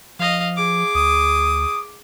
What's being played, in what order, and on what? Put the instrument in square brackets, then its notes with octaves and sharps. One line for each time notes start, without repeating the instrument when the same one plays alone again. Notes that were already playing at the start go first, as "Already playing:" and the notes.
[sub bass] F3 [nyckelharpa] D#5 F5
[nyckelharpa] G#4 D6
[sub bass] D2 [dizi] D#6